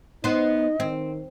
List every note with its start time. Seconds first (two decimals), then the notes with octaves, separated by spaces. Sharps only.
0.24 B3 D#4 C5 D#5
0.80 D#3 C4